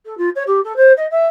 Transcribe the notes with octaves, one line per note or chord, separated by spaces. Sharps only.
A4
F4
C#5
G4
A4
C5
D#5
E5